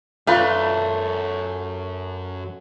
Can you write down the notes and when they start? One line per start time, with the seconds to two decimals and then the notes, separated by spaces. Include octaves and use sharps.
0.27 F#2 A3 D4 F4 B4 C6